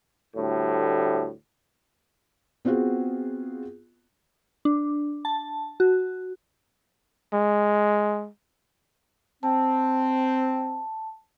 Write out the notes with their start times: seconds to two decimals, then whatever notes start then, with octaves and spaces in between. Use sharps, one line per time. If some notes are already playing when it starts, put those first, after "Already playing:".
0.35 D2 A2 G3
2.65 B3 C4 F4 F#4 G#4
4.65 D4
5.25 A5
5.80 F#4
7.33 G#3
9.43 C4 A5